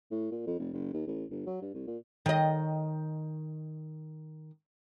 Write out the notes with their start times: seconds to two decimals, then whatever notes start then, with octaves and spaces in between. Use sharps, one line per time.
0.11 A2
0.31 A#2
0.47 F2
0.60 F1
0.73 F#1
0.93 D#2
1.07 A1
1.30 G1
1.47 F#3
1.62 G2
1.74 C2
1.87 A#2
2.26 D#3 D#5